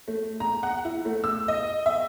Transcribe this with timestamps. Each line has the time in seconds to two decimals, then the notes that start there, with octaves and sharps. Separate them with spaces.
0.08 A3
0.40 A#5
0.63 F#5
0.85 E4
1.05 A3
1.24 E6
1.48 D#5
1.86 E5